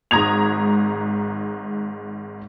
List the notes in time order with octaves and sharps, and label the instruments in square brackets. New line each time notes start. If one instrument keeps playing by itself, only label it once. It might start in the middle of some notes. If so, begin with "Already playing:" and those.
[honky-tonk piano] G#1 G#2 A#5 D#6 G#6 F7